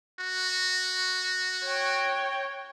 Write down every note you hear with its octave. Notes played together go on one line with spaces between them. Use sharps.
F#4
C#5 G5